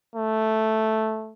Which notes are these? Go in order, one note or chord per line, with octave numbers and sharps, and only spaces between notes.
A3